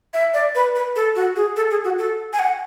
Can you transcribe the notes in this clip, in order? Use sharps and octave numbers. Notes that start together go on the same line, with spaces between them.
E5
D5
B4
B4
A4
F#4
G#4
A4
G#4
F#4
A4
G#5
F#5